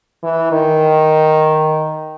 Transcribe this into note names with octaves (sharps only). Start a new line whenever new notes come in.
E3
D#3